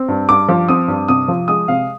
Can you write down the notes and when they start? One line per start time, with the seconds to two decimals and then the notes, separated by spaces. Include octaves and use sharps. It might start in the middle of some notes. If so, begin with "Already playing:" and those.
Already playing: C4
0.08 G2
0.29 G2 D6
0.49 F3
0.69 C4 D#6
0.88 G2
1.08 C3 D#6
1.28 F3
1.48 G#3 D#6
1.68 C3 F5